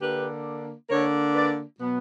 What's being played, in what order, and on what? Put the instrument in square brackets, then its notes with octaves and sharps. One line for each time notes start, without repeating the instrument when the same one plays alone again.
[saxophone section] D3 A#3 D4 G4 B4
D3 A#3 D4 A#4 C#5
B4 D5
B2 F#3 B3